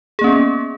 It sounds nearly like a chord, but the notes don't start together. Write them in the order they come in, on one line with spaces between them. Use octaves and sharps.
G#4 A#3 C#4 B3